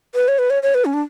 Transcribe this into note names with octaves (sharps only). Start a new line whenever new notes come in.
B4
C#5
B4
C#5
C#5
B4
C#4
D4